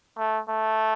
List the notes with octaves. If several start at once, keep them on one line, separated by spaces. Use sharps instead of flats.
A3
A3